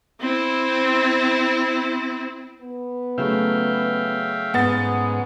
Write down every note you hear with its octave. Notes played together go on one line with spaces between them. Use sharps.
C4 E4
B3
C#3 F#3 A3 E5 F5 G5
G#2 B3 A6